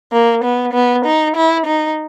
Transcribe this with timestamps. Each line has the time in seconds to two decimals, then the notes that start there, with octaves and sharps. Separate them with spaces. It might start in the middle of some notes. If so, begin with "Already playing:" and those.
0.13 A#3
0.44 B3
0.74 B3
1.05 D#4
1.36 E4
1.67 D#4